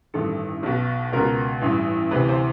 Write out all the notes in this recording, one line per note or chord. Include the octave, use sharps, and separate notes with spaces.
A1 G2 D#3 A4
B1 B2
C#2 B2 A#4
A1 G2 E3
D2 C3 E3 B4
C5